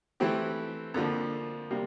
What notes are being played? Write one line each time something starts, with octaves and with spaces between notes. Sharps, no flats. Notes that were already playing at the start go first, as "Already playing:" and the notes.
E3 A3 C4 E4 G4
F2 D3 F3 A#3 F4
C3 G3 A#3